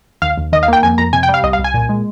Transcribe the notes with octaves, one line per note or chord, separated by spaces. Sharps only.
D#2 F5
D#2
D#3 D#5
F5
A#3 G5
F2 G#5
F2 A#5
C3 G#5
G5
G3
F5
C2 D#5
F5
C2
G#5
A#2
G#3